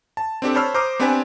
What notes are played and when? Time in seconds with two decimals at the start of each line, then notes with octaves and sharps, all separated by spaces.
0.17 A5
0.42 C4 D4 G4 A4
0.55 C5 C#5 A5 B5 E6 F6
0.74 C5 A#5 D6 D#6 F6
0.99 B3 C4 D4 G4 B4 G#5